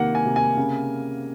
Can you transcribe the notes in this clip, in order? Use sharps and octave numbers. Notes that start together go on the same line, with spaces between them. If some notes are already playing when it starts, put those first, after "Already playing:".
Already playing: C3 D#3 A#3 F#5
G#5
C3
G#5
C#3